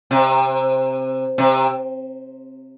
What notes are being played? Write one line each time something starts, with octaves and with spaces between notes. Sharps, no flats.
C3
C3